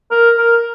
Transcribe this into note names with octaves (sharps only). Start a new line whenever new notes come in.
A#4
A#4